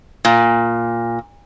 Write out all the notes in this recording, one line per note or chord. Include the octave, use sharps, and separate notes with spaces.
A#2